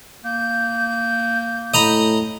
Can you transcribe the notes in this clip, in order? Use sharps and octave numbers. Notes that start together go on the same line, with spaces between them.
A#3 G6
A2 D#5 A#5 B5